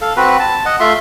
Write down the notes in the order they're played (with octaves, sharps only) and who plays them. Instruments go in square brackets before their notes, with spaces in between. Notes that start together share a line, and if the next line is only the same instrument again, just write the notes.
[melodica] A4 F5
C4 F#4 B4
A5
D#5 F#5
A3 F4 E5 C6